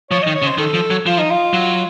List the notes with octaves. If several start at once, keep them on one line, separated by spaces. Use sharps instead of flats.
F3 C#5
D#3 D#5
C#5
C#3
C5
D#3 A4
F3
F#3
F3 F4
D#4
F4
F#3